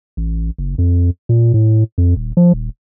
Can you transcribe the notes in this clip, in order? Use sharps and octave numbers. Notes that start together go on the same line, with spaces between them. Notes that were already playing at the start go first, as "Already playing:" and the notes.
A1
F#1
F2
A#2
A2
F2
D#1
F3
D#1